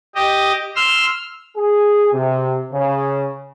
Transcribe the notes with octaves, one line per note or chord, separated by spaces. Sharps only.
G4 D#5
C6 E6 F6
G#4
C3
C#3